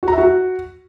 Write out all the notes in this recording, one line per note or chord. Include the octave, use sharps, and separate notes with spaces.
F#4
A#5
E5
F#4